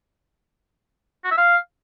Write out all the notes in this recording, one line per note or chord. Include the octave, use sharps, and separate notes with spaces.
F#4
E5
F5